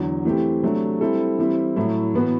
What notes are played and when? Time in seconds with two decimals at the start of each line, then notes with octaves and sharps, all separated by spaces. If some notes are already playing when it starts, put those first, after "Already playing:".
Already playing: E2 D3 F#3
0.25 E3 A3 C4 G4
0.63 C3 F#3 A3 D4
1.01 G3 C4 E4 A4
1.39 E3 G3 C4 E4
1.76 A2 F#3 A3 E4
2.14 A2 E3 B3 F#4